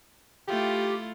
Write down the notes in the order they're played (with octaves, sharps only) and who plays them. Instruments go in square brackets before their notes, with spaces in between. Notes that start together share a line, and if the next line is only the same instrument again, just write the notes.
[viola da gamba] A3 E4 F4 [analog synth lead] G4